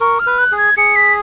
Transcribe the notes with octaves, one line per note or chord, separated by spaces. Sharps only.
A#4 C#6
F6
B4
F#6
G#4
G#6
G#4 C#7
B6